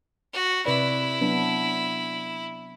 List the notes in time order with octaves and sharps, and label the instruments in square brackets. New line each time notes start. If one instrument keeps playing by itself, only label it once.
[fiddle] F#4
[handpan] C3 B4 D5 [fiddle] E4
[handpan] F#3 B3 D4